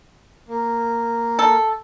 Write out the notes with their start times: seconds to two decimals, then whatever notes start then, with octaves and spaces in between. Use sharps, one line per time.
0.48 A#3
1.39 A4